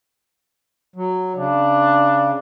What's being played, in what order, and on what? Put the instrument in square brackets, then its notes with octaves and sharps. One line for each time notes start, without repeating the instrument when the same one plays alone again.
[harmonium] F#3
[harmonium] C#3 [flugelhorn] D4